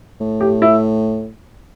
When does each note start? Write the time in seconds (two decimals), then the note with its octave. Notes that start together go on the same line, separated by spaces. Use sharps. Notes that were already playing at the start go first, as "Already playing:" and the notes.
0.20 A2
0.41 G4
0.62 E4